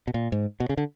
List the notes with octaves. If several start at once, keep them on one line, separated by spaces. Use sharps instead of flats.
B2
A#2
G#2
B2
C#3
D3